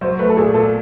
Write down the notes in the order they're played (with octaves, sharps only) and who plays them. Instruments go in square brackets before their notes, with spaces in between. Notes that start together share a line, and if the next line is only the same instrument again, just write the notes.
[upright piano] F#3 [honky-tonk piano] C5
[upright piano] A3 [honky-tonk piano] B4
[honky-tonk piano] A4
[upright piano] A#2 [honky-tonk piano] G#4
[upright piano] A#2 [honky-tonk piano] A4